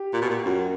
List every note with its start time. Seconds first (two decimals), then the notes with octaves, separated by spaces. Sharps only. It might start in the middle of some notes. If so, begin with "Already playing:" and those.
Already playing: G4
0.13 A#2
0.22 B2
0.30 A#2
0.45 F#2 F#4